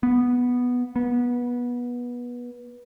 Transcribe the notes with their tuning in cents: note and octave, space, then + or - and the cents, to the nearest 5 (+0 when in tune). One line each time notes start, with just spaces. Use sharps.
B3 -5
B3 -20